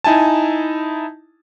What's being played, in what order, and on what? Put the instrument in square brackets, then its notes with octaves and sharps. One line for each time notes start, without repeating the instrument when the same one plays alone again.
[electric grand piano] D#4 E4 G#5 A5